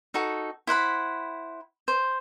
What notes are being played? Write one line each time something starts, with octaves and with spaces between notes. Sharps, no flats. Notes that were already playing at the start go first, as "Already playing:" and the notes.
D#4 F#4 A4
E4 C5 F#5 B5
C5